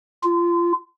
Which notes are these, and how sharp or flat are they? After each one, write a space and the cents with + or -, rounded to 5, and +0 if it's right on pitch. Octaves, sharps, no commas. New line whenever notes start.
F4 -25